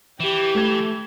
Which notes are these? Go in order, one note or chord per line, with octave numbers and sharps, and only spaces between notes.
E3 G4
A3 G#6